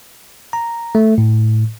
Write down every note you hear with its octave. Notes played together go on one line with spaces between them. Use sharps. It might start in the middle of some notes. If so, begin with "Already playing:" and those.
A#5
A3
A2